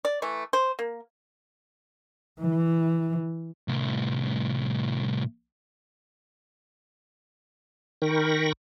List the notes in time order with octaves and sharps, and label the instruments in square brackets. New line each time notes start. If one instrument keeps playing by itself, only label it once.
[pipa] D5
E3 A3
C5
A#3
[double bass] E3
[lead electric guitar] C2 A2
[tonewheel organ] D#3 A#4 G5 B5 C#6 A#6